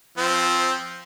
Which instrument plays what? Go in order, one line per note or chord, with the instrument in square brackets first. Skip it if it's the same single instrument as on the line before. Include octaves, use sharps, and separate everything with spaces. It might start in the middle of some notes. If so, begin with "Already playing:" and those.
[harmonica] F3 C4